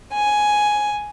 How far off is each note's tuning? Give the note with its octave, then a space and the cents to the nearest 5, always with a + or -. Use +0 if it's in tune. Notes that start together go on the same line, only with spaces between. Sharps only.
G#5 +5